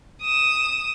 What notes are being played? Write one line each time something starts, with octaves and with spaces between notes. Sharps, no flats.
D#6 E7